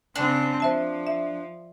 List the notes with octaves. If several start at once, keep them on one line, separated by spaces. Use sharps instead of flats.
C#3 C4 D4
F3 C5 E5 A5
E5